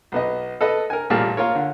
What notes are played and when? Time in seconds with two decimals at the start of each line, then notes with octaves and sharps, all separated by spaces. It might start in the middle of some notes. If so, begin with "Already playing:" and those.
0.12 B1 B3 D#5
0.61 A4 B4 D#5
0.90 A#4 G#5
1.10 A1 A#2 G3 G#4 F5 A5
1.37 A#3 F4 A#4 C#5
1.55 D3